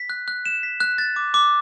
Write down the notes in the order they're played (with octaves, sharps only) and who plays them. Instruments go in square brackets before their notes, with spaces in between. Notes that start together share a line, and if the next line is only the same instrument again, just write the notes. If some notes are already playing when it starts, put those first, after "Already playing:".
Already playing: [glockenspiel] B6
F#6
F#6
E7
B6
F#6
A6
D6
D6